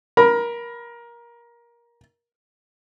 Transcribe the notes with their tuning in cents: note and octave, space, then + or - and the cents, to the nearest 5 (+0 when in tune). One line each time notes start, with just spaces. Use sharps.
A#4 +20 B5 +0